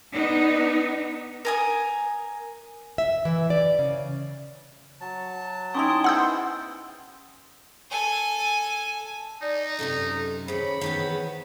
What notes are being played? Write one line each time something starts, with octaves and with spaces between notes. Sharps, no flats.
B3 D4 D#4
A#4 G#5 D#6
E5
E3
D5
C#3
F#3 A5
C#4 D#4 E4 G5 C6 D#6
B3 G#4 C5 F#5 E6 G6
A4 G#5
D#4 D5
F#2 C3 D#3 A4
D#2 C#3 G#4 C5 C#5 B5
D#3 E3 B3